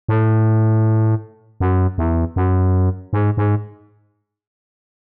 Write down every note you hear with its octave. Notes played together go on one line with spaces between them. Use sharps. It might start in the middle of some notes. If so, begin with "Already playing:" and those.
A2
F#2
E2
F#2
G#2
G#2